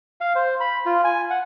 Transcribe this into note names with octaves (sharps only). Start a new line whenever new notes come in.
F5
C5
B5
F4
G#5
F#5